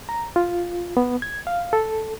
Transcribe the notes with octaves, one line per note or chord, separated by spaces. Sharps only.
A#5
F4
B3
G#6
F5
A4